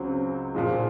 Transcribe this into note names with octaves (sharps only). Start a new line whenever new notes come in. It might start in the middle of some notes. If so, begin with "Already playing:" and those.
Already playing: C#2 C#3 F#3 C4
A#2 F3 G#3